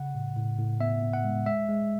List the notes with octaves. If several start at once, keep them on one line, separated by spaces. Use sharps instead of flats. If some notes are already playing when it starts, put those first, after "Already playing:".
Already playing: C#3 F#5
A2
A2
A2
B3 E5
B3
F#5
G#3
G#3 E5
G#3